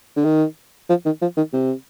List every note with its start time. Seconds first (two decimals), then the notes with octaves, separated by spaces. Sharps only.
0.16 D3
0.25 D#3
0.89 F3
1.05 D#3
1.22 F3
1.37 D#3
1.53 C3